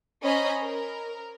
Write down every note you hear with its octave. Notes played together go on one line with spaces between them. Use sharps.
C#4 C5 D#5 G#5 A#5 B5
A#4